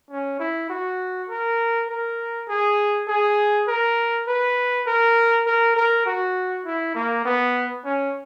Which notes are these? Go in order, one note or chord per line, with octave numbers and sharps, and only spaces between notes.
C#4
E4
F#4
A#4
A#4
G#4
G#4
A#4
B4
A#4
A#4
A#4
F#4
E4
A#3
B3
C#4